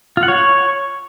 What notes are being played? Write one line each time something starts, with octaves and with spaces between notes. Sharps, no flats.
F4
F#5
C#5